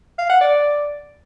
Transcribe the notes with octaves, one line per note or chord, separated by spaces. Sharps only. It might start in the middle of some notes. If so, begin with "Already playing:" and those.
F5
F#5
D5